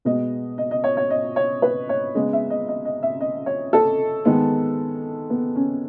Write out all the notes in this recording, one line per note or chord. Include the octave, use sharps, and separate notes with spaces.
B2 G#3 B3 D#5
D#5
D#5
C#5
C#5
D#5
C#5
B4
C#5
C#3 G#3 B3 D#5
E5
D#5
D#5
D#5
E5
D#5
C#5
A4
D#3 G#3 B3
B3
C#4